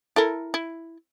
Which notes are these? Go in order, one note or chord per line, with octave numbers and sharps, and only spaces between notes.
E4 A4 A#4
E4